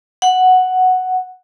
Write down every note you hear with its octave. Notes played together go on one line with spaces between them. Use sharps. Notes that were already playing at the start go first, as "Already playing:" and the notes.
F#5